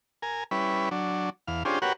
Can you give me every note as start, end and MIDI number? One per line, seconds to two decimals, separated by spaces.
0.22 0.44 70
0.22 0.44 80
0.51 0.89 55
0.51 0.89 61
0.51 0.89 64
0.51 0.89 71
0.91 1.30 54
0.91 1.30 62
1.47 1.63 40
1.47 1.63 77
1.65 1.79 61
1.65 1.79 62
1.65 1.79 65
1.65 1.79 67
1.65 1.79 68
1.65 1.79 72
1.82 1.93 66
1.82 1.93 67
1.82 1.93 70
1.82 1.93 71
1.82 1.93 73
1.82 1.93 78